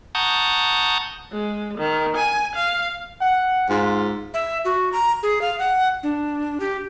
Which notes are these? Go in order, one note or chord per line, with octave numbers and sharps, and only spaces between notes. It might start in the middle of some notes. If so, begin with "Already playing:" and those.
F#5 A5 A#5 C#6 D#6 G6
G#3
D#3
G#5
F5
F#5
G#2 F4
E5
F#4
A#5
G#4
F5
F#5
D4
G4